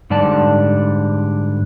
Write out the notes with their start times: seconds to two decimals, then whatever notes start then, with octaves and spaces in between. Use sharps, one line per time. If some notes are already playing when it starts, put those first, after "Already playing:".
0.10 G#2 D3 G3 D5 A5